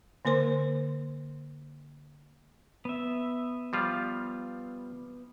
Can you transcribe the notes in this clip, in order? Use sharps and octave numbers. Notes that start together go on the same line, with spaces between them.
D3 A#3 A#4 C5 C6
B3 E5
F3 G3 F4